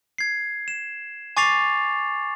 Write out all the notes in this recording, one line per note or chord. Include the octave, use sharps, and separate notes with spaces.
G#6 C7
E7
G#5 C#6 D6 A6 C7 F7